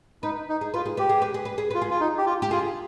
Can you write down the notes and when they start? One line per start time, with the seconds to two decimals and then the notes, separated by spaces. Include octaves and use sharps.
0.23 D#4 B4
0.49 D#4
0.61 G#4
0.74 F4 B4
0.86 G#4
0.97 G4 B4
1.09 G#4
1.22 B4
1.34 G#4
1.45 B4
1.58 G#4
1.71 F4 B4
1.82 G#4
1.90 F4
2.00 D#4
2.18 G4
2.26 F4
2.42 G4
2.51 F4 G#4